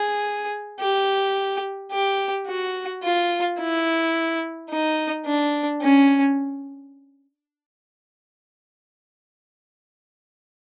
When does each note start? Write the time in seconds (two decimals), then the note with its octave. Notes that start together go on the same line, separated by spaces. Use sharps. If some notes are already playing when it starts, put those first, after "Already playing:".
Already playing: G#4
0.80 G4
1.91 G4
2.47 F#4
3.03 F4
3.59 E4
4.70 D#4
5.26 D4
5.81 C#4